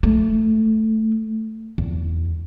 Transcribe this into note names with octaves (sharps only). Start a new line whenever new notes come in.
A3
E2